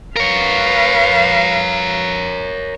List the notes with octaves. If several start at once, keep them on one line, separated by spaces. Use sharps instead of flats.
A#4 B4 C#5 F5